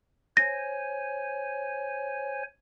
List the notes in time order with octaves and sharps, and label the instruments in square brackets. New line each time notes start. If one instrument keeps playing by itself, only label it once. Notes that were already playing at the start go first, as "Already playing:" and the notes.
[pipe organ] C5 C#5 G#5 [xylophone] A#6